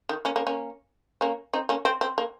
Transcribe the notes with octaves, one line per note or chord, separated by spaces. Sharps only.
D#3
A#3 C#4
A#3 C#4
A#3 C#4
A#3 C#4
C4 D#4
A#3 C#4
C4
C4
A#3